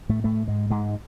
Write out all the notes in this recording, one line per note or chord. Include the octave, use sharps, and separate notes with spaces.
A2 A3
A2 A3
G#2 G#3
G#2 G#3